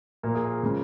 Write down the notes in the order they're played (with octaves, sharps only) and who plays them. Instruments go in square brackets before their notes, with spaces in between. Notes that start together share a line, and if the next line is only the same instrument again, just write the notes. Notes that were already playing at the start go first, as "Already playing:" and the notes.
[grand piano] A#2 F3 A#3 A#4
G#4
A#4
C#3 F3 G#3